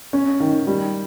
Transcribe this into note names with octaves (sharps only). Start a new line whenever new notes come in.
C#4
D#3
G3